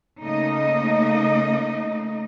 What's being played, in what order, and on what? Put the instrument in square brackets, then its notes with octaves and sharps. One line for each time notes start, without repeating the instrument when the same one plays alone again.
[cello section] C#3 A3 A#3 D#4 D#5